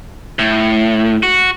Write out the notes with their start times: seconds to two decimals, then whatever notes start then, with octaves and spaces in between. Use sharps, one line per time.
0.39 A2
1.23 F#4